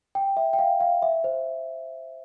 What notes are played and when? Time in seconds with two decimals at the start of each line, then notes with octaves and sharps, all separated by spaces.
0.15 G5
0.37 E5
0.53 G5
0.59 F5
0.80 F5
1.02 E5
1.24 C5